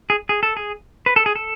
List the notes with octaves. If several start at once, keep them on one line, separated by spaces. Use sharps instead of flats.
G#4
G#4
A4
G#4
B4
A4
G#4
A4